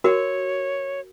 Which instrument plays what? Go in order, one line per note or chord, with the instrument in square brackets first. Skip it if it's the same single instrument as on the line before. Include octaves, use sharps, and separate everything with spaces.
[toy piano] F#4 A#4 [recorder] C#5